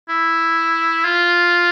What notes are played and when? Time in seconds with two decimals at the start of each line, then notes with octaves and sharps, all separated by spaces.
0.09 E4
1.05 F4